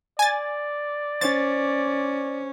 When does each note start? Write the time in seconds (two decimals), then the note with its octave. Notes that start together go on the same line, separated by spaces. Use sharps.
0.19 D5 G#5 A6
1.21 C#4 C5 A6